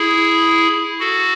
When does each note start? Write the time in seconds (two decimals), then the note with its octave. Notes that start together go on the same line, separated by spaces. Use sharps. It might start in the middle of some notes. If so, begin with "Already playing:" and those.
Already playing: E4 G#4
1.00 F#4 A4